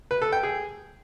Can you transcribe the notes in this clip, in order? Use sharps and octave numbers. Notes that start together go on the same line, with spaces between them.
B4
A4
G5
G#4